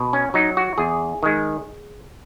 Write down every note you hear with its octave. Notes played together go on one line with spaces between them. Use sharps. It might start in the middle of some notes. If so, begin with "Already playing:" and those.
Already playing: B2
C#4
F#3 D#4
F#4
E2 G#4
D#3 G#3